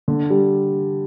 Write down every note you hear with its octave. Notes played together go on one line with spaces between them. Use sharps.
D3
G3